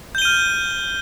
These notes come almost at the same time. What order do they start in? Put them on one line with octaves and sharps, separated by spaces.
G6 G7 D#7 F6